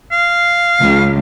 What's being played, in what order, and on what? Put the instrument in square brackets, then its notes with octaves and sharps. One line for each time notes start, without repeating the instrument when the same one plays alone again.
[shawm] F5
[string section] C#2